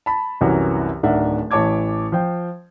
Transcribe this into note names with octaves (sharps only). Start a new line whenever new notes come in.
A5 B5
C2 F#2 E3 F#4 A#4 C#5
D1 D#3 D4 A#4 E5 F#5
A1 E3 C#5 A5 D6 G#6
F3 C5 G5